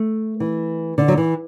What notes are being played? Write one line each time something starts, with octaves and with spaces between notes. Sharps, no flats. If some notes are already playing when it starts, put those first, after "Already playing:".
Already playing: A3
E3
D3
F#3
E3